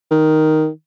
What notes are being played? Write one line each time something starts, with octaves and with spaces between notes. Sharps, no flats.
D#3